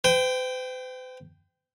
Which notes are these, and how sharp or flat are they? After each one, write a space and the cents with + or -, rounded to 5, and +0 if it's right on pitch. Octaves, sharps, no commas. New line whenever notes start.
C5 -45 G5 +0